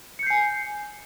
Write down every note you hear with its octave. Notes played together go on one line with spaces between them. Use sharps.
G#5 G6 C7 C#7